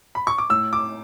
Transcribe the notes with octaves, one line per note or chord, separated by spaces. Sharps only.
B5
C#6
D6
A2 E6
D6